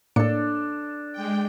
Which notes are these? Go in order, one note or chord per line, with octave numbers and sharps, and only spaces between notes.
A2 A#3 D4 A4 C#7
G#3 G5